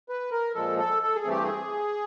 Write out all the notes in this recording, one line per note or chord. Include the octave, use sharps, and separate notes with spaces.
B4
A#4
A#2 F3 G#3 A4
A4
A4
G#4
G2 E3 A3 C4 G4
G#4